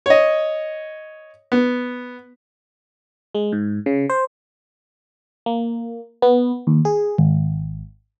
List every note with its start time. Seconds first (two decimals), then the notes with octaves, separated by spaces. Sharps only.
0.06 C#5 D#5
1.52 B3
3.35 G#3
3.52 G#2
3.86 C#3
4.09 C5
5.46 A#3
6.22 B3
6.67 D#2
6.85 G#4
7.18 G#1